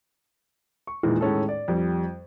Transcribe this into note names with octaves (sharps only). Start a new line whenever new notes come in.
C#6
E2 A#2 D#3 E3 G#3
A2 D#3 G#3 C#4 D#4 A4
D5
F2 G3